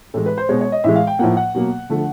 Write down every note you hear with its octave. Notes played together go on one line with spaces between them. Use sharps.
A2 E3 G#3 A4
B4
C5
B2 G#3 C#5
C#5
D#5
A2 E3 G#3 E5
F5
G5
A2 F3 A#3 F#5
F#5
B2 F#3 A#3
D3 F3 A3